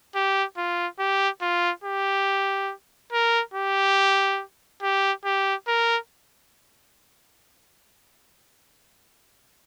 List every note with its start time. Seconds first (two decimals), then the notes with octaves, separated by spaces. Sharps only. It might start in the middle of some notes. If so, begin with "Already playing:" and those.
0.15 G4
0.57 F4
0.99 G4
1.42 F4
1.84 G4
3.12 A#4
3.54 G4
4.83 G4
5.25 G4
5.68 A#4